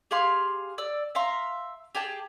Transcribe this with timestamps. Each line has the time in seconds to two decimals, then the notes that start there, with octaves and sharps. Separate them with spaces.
0.11 G4 G#4 F5 C6
0.78 D5 E6
1.15 E5 F5 A#5 C6
1.95 G4 G#4 G5 A5